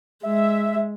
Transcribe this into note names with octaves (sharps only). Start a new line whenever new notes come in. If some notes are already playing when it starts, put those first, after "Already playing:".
G#3 E5